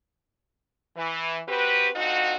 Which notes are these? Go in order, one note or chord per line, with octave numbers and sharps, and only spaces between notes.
E3
C4 F#4 G4 B4
D3 C4 D#4 F4 F#4